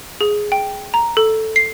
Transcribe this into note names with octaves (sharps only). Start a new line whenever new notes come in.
G#4
G5
A#5
A4
C7